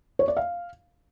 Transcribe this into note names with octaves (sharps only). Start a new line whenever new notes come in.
C#5
D5
F5